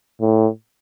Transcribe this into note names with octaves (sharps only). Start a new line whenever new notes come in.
A2